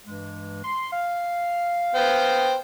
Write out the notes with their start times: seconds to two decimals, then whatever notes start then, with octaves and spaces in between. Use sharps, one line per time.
0.06 G2 E3 G#3
0.64 C6
0.92 F5
1.95 B3 C5 G5